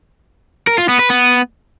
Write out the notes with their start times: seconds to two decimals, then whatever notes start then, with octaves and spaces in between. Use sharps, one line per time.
0.67 A#4
0.78 F4
0.89 B3
0.99 B4
1.10 B3